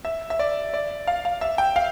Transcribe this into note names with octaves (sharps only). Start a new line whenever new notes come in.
E5
E5
D5
D5
F5
F5
E5
G5
F5